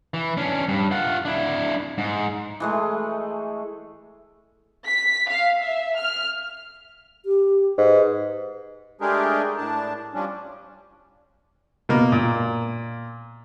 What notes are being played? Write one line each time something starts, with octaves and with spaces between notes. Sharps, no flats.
E3
C#4 D4
G2
F4 F#5
D4 E4
G#2
E3 G#3 A3
B6
F5
E5
F6
G4
G#2 B4
G#3 A3 D4 G4 G#4 A#4
A2 D4 A5
F3 G3 C#4 D4
B2 A#3
A#2